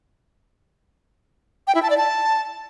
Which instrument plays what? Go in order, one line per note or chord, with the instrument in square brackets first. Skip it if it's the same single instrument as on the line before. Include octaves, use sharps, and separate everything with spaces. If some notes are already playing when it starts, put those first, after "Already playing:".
[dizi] G5
E4
A5
D5
A5